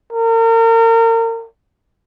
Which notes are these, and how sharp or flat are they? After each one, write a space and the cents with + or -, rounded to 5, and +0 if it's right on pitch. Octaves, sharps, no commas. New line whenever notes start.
A#4 -35